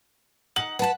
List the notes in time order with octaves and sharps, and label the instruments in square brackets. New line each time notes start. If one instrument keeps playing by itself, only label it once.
[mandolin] D#4 F#5 [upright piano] F#7
[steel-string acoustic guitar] B4 A5 [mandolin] F#5 B5